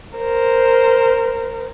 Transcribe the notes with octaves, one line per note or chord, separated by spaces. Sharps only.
A#4 C5